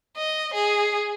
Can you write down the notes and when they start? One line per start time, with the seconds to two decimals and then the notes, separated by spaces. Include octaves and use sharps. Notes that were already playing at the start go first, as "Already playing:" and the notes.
0.17 D#5
0.54 G#4